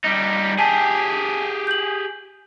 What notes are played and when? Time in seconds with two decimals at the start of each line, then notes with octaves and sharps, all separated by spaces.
0.05 G3 D#4
0.59 G4 G#4 G#5 A5
1.67 G6 F#7